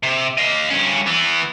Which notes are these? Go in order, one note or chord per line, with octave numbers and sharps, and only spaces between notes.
C3
D#5 F5
G2 C#4
E3 B3